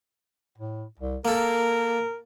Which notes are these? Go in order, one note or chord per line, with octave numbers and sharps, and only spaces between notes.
A2
C2
A#3 A4 A#4